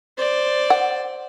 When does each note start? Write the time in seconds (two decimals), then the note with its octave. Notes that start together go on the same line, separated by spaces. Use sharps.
0.17 C5 D5
0.70 F#5